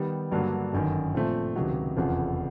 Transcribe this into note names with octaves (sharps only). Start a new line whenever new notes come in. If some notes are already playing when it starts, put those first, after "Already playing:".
Already playing: D#3 G3 B3
G2 D3 F#3 A#3 D4
G1 F#2 D#3
A#2 F3 A3 C4
C#2 C3 D#3 F#3
F1 E2 C#3 F3